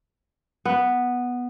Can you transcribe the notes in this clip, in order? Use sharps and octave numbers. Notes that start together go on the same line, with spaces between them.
B3